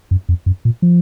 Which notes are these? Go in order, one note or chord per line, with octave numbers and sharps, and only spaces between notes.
F#2
F2
F#2
A#2
F3